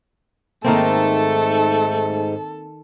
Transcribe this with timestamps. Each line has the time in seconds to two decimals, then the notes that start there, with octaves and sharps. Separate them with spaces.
0.64 G#2 D#3 A3 A#3 C4 A4